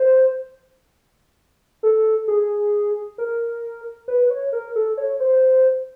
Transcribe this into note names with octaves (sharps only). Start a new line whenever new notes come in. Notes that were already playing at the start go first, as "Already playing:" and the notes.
Already playing: C5
A4
G#4
A#4
B4
C#5
A#4
A4
C#5
C5